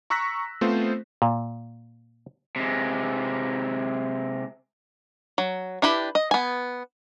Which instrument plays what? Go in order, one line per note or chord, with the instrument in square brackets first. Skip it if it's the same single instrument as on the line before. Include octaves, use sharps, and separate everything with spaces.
[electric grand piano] A#5 C#6 E6 F#6 A#6 B6
A3 B3 C4 F4 C5
[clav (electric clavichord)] A#2
[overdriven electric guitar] C3 G#3
[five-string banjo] F#3
D4 E4 G4 B4
D#5
B3 G#5